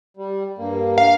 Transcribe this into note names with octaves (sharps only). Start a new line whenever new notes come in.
G3
G2 A#3
F5